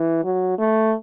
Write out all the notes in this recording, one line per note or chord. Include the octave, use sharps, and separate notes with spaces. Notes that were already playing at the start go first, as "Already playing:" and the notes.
Already playing: E3
F#3
A3